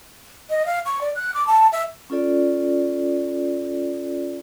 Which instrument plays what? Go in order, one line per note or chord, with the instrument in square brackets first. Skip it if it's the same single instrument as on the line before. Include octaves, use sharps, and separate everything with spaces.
[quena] D#5
F5
C#6
D5
F#6
D6
A5
E5
[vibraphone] C#4 F4 A4 D5